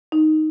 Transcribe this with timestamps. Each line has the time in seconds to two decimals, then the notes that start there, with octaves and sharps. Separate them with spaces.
0.12 D#4